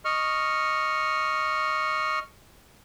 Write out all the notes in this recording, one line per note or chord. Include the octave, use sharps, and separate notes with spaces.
D#5 C#6 F6